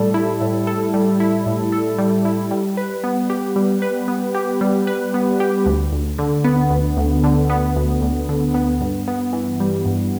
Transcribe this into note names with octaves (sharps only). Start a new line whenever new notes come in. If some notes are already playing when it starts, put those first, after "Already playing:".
Already playing: A2 G3 A4
E4
A2
A4
G3
E4
A2
A4
G3
E4
G3
B4
B3
G4
G3
B4
B3
G4
G3
B4
B3
G4
D2
D2
D3
B3
D2
D2
D3
B3
D2
D2
D3
B3
G2
B3
E3
G3
G2